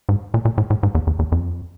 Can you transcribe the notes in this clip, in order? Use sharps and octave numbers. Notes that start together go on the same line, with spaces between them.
G#2
A#2
A#2
A2
A2
G#2
E2
E2
E2
F2